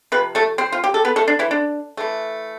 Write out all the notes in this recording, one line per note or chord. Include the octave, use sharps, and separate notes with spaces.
C3 F3 B4
A3 A4
C4 C5
F4
G4
A4
B3 B4
A3 A4
D4
E3 E4
D4
E3 A3